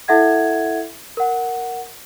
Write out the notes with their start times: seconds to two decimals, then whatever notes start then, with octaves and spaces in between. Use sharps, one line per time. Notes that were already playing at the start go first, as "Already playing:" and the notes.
0.08 E4 A4 E5 F#5 G#6
1.17 A#4 F#5